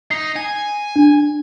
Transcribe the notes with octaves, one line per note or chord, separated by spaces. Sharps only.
D#4 C7
G#5
D4